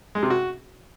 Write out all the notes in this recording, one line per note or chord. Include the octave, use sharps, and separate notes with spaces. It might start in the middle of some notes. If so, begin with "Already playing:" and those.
G#3
C3
F#4